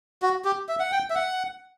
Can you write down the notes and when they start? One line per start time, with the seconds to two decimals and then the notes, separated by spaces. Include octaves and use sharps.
0.22 F#4
0.45 G4
0.69 E5
0.80 F#5
0.92 G5
1.10 E5
1.15 F#5